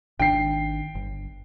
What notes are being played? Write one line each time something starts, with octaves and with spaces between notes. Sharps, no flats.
G#1 D#3 D4 G5 C7
G1